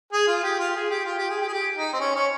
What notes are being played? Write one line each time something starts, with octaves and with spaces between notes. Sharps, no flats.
G#4
F4
G4
F4
G#4
G4
F4
G4
G#4
G4
G#4
G4
D#4
C4
C#4
C#4